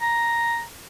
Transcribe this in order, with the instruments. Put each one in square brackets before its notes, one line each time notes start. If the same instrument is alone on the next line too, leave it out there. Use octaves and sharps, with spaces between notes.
[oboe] A#5